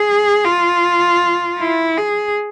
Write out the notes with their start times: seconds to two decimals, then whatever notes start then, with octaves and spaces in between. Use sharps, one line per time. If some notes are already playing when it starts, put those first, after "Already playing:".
Already playing: G#4
0.45 F4
1.59 E4
1.97 G#4